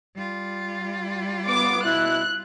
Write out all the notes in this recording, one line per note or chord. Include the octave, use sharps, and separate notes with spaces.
G3 F4
B3 D6
B2 E4 F#6